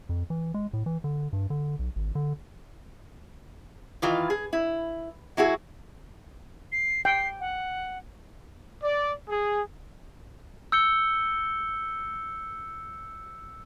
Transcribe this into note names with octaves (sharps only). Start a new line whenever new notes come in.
F2
E3
G#3
A2
E3
D3
G2
D3
B1
G#1
D3
D#3 E3 F4
G#4
E4
F#3 E4 F#4 G#4
C7
G5 C7
F#5
D5
G#4
E6 G6 C#7 G7